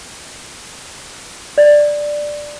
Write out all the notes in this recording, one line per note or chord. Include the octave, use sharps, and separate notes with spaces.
D5